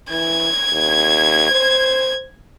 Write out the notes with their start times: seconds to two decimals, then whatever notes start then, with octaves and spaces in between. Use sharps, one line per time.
0.10 E3 G#6
0.72 D#2
1.51 C5